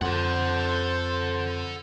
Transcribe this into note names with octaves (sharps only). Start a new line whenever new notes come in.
F2 A4 C5 F#5